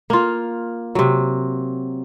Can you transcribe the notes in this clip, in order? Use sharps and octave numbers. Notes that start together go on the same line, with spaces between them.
A#3 F4
C3 F#3